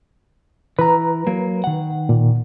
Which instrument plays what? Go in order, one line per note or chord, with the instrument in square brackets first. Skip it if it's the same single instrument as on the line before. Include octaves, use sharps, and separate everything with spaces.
[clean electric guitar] E3 [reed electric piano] B4 A#5
[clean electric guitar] F#3 A#3
D#3 F#5
[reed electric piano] A#2